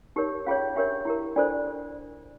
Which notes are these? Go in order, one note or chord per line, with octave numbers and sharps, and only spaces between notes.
D#4 G4 A#4 C#5
C#4 F4 G#4 C#5 F5
D4 G4 A#4 C#5 E5
E4 G4 A#4
D4 F4 A4 C5 D5